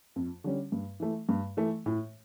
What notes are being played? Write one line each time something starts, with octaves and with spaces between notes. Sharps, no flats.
F2
D3 G3 C#4
G2
E3 A3
G2
E3 A3
A2